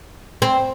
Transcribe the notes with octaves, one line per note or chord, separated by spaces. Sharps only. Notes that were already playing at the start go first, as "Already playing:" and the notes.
C4